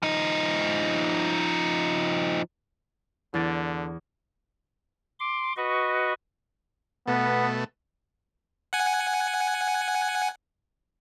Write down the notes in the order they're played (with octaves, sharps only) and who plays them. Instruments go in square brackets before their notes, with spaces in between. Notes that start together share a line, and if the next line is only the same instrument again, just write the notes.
[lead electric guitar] F3 D#4
[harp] E2 A6 D7 [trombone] D3
[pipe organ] C6 D6
F#4 B4 D#5 C#6
[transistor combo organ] B2 A3 [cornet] B3
[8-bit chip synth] F#5 G#5